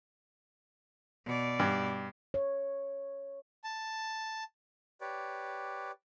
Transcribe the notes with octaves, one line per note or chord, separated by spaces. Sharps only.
B2 D5
G2
C#5
A5
G4 B4 C#5 D5